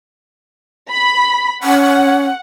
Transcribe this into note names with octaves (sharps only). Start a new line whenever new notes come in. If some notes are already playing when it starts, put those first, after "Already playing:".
B5
C#4 F#5